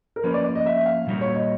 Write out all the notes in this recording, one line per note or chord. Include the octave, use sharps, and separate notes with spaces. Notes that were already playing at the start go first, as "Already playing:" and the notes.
A#4
F3 A#3 C#4 B4
D5
D5
D#5
E5
F5
A#2 G3 A#3 D#4 F#4
C#5
D#5